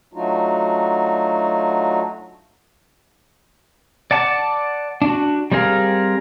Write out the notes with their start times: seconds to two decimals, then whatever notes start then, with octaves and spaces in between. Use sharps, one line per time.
0.13 F#3 A3 D4 D#4 F4 F#4
4.11 D5 F#5 A5 D6
5.02 D4 F#4
5.52 G3 C4 G#4 A#4 F5